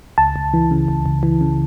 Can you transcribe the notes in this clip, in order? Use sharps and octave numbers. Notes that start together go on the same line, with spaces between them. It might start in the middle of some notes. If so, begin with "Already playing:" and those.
C#2 A5
C#2
E3
C#3
C#2
C#2
E3
C#3